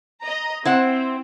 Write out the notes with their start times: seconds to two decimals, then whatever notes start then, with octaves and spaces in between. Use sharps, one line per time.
0.21 D#5 A#5
0.65 C4 E4 C5 F#5